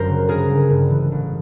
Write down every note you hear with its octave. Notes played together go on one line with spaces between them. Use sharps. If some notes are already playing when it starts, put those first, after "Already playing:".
Already playing: G1 F#2 F#3 A#4 C5
C#3
G1 G#4 A#4
G1
G2
E3
A1